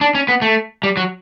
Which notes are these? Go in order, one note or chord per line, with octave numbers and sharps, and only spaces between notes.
D4
C#4
B3
A3
G3
F#3